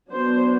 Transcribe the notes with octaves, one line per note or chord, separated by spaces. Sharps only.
F#3 B3 D4 C5